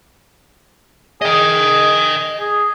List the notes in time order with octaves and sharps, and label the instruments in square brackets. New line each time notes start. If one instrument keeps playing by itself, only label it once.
[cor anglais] G#4 [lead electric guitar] D#5 G5
[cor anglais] G#4